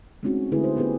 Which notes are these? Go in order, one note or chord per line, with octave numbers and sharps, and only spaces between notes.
G#3 A3 C4 C#4 D#4 F#4
D3 A3 E4 G#4 B4
F#4 C5
B3 D#4 G4 G#4 B4